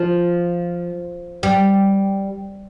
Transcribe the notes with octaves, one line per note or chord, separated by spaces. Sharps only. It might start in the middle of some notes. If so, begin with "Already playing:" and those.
Already playing: F3
G3